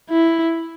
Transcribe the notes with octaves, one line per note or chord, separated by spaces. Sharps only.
E4